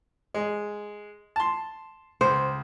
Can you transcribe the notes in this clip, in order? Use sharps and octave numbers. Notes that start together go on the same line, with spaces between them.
G#3
A5 C6
C#2 C5